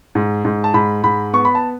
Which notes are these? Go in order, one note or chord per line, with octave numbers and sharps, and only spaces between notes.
G#2
G#2
A5
G#2 B5
G#2 B5
B3 C#6
B5
A5